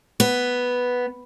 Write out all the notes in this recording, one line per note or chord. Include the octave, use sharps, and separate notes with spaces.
B3